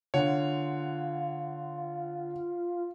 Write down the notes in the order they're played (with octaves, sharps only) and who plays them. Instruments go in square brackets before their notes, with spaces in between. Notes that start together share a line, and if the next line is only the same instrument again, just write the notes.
[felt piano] D3 F#5 [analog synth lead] F4 [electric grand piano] C#5